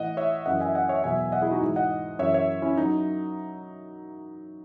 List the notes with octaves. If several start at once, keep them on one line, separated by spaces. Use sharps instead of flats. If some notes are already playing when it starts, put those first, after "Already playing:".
Already playing: A2 E3 D#5 F#5
C#5 E5
F#2 E3 D#5 F#5
E5 G#5
D#5 F#5
C#5 E5
E2 B2 F#3 E5 G#5
D#5 F#5
E4 G#4
D#4 F#4
G#2 E3
D#5 F#5
F#2 E3 C#5 E5
C#5 E5
C#4 E4
F#3 D#4